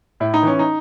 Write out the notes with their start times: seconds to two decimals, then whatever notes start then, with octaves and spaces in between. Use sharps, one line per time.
0.20 A2 E4
0.34 D#4
0.43 E3 C#4
0.59 D#4